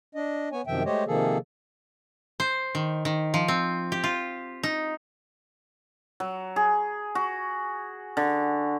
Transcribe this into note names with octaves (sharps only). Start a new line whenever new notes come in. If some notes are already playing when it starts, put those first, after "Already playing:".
D4 D#5
B3 C#5 G#5
F#2 C3 D#3 F3 E5 G5
G#3 A3 G4 C5 C#5 D#5
C3 D#3 F3 A#3 G#4 A4
C5
D#3
D#3
F3
C4
G4
F4
D#4
F#3
G#4
F#4
D3